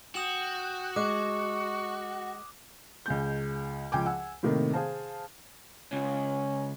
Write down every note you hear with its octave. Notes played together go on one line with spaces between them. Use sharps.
F#4 G5 D#6 E7 F#7
G#3 C#6 D6 F#6
C#2 G#3 G6
C#2 F3 G5 G#5 D6
F#5 G#5 E6
A2 C3 D#3 A#3
G#4 C5 F5 A5
C#2 C#4